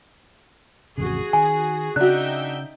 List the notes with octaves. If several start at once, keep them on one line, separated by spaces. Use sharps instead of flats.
A1 F2 C#3 F#4 G#4
D#3 G#5
C#3 D4 D#4 F#4 E5 G5 F#6